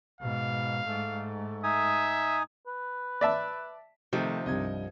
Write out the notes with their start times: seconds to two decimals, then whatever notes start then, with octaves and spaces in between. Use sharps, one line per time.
0.21 G#2 B2 F5
0.87 G#2 A3
1.64 D#4 E5 G#5 D#6
2.67 B4
3.21 D5 E5 A5
4.13 C3 D#3 F3 A3 D#4 C5
4.46 C2 G2 D#5 D#6 G#6